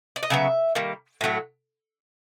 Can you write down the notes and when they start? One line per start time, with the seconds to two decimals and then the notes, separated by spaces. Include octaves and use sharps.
0.16 D5
0.23 D#5
0.30 C#3 F#3 B3 E5
0.75 D#3 G3 A#3
1.21 A2 F#3 A3